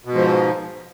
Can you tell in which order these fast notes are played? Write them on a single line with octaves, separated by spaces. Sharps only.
B2 G#2 F3